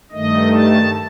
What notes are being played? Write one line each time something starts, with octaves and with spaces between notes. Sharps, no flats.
G2 D#3 A3 D#5
A5